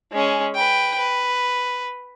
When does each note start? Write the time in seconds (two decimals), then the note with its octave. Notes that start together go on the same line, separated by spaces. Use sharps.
0.13 G#3 C#4
0.54 B4 G5
0.98 B4